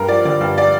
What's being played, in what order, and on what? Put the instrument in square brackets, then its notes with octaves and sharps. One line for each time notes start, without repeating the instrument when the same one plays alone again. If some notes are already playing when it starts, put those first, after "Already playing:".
Already playing: [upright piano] G2 A#4
F3 D5
D3 D5
G2
D5